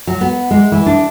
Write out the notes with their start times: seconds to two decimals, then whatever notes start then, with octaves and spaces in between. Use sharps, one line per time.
0.07 F#3
0.21 B3
0.51 G#3
0.72 E3
0.86 D4